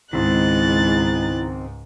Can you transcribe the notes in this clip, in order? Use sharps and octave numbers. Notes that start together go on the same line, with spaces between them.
C#2 G#2 D#3 G#3 C4 E4 F#6 A6